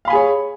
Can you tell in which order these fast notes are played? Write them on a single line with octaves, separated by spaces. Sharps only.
F5 B5 G#5 G#4 C#5